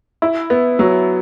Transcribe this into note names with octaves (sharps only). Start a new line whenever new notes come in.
E4
B3
F#3